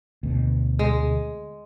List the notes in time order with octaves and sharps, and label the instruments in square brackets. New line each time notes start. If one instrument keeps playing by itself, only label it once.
[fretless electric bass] D2 B2
[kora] G#3